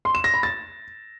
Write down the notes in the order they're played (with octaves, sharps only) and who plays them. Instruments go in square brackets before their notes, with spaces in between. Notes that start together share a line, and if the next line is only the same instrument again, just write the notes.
[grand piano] C6
E7
A#6
B5
A6